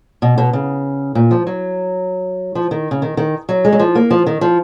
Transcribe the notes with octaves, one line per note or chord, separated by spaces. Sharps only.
B2
B2
C#3
A#2
F3
F#3
F3
D#3
C#3
D#3
D#3
F#3
G#3
F#3
F3
A#3
F3
D#3
F3